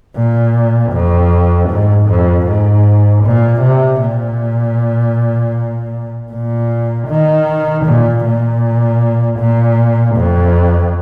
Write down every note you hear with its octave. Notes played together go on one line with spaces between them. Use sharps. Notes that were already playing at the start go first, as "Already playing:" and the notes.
A#2
F2
G#2
F2
G#2
A#2
C3
A#2
A#2
D#3
A#2
A#2
A#2
F2